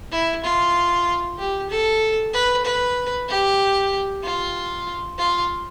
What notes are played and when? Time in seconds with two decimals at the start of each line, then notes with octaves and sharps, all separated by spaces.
0.12 E4
0.44 F4
1.38 G4
1.70 A4
2.33 B4
2.65 B4
3.28 G4
4.23 F4
5.18 F4